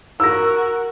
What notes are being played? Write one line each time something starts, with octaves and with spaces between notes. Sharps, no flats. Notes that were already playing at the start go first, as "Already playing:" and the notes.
F#4 A#4 E6 A#6